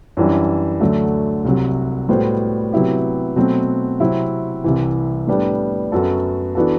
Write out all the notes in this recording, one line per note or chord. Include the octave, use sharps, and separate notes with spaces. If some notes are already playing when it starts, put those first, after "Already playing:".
F#2 E3 G3 D4
D2 D3 F#3 A3
C2 C3 F#3
A2 G3 B3 F#4 C5
C3 F#3 B3 E4 G4
B2 F#3 A3 C4
C3 F#3 C4 E4
C2 C3 E3
A2 G3 B3 D4
F#2 F#3 B3 F#4 A4
E3 B3 D4 F#4 A4